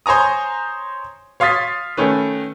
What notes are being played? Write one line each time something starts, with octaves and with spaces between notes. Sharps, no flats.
C5 C#5 G#5 A#5 D#6
C#5 F5 C6 D#6 A6 B6
D#3 A3 C#4 B4